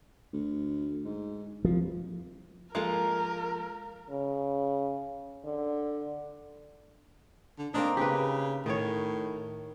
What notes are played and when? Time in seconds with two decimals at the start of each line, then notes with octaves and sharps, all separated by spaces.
0.33 D2
1.05 G#2
1.65 C2 F3
2.75 F3 G#3 A#3 F4 A4 A#4
4.10 C#3
5.44 D3
7.58 D3
7.74 A#3 C4 D4 D#4
7.97 C#3 G4 B4
8.66 A2 D#3 C#5